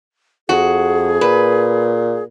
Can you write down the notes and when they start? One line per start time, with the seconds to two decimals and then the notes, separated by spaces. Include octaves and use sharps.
0.49 F2 F#4 G#4
1.21 A#2 B4